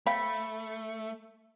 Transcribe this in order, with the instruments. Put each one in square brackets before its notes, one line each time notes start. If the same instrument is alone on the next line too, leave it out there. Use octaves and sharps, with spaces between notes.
[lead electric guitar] A3 [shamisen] C5 F5 G5 [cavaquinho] B5